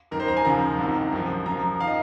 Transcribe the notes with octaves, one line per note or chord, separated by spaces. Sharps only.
F#2 D#3 A#4
C5
A#5
G#5
D#2 C#3 F3 A#5
C2 C3 D#3
F#2 F3
F#2 F3 A#5
D#3 F5
D#5